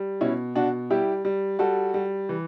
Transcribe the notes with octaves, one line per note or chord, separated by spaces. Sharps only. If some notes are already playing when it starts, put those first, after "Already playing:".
Already playing: G3
B2 C#4 E4
B2 D4 F#4
G3 E4 G4
G3
G3 F#4 A4
G3
E3